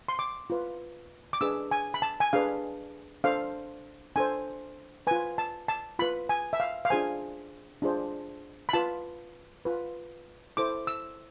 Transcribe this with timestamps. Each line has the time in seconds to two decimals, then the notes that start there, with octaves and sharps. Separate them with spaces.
0.08 C6
0.19 D6
0.50 F4 B4
1.33 D6
1.41 D4 G#4 B4 E6
1.71 G#5
1.94 B5
2.02 A5
2.20 G#5
2.33 D4 G#4 B4 F5
3.24 D4 A4 C5 F5
4.16 D4 A4 C5 G#5
5.07 F4 B4 G#5
5.38 A5
5.68 A5
5.99 F4 B4 B5
6.29 G#5
6.53 E5
6.60 F5
6.85 F5
6.90 D4 F4 G#4 C5 G#5
7.82 D4 F4 G#4 C5
8.69 B5
8.73 F4 B4 A5
9.65 F4 B4
10.57 E4 A4 C5 D6
10.87 E6